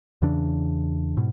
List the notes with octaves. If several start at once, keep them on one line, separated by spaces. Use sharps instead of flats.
E2 C#3 E3 D4
G#2 B2